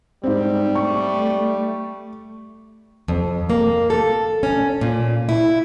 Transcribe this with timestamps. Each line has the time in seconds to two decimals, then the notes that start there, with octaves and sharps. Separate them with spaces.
0.23 G#2 G3 C4
0.75 A3 C#6
3.08 F2
3.50 A#3
3.90 A4
4.43 C#4
4.81 A#2
5.29 E4